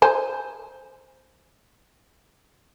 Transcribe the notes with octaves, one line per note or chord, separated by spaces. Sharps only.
C5 G#5